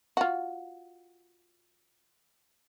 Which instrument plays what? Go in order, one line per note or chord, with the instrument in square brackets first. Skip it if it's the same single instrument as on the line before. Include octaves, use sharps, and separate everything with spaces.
[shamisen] F4 F#4